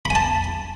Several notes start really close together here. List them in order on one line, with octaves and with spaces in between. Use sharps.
B5 G#5 A5